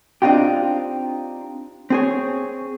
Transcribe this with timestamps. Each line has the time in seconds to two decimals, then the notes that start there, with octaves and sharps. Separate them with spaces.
0.22 C4 D4 D#4 F4 G4
1.90 C4 G#4 C#5